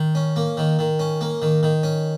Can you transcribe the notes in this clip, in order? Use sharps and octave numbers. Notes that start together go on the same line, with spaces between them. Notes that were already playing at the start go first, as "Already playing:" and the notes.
Already playing: D#3
C#4
A#3
D#3
D#3
C#4
A#3
D#3
D#3
C#4